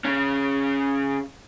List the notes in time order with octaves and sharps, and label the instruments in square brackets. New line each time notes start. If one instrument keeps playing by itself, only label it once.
[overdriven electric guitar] C#3 C#4